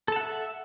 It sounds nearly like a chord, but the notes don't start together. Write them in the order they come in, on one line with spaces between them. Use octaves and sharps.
A4 A5 F#5 E5